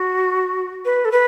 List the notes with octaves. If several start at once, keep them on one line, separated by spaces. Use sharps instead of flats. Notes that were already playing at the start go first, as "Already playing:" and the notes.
Already playing: F#4
B4
A4
B4